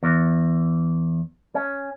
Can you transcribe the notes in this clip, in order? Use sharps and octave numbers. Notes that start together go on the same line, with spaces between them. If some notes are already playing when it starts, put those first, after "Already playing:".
E2
C#4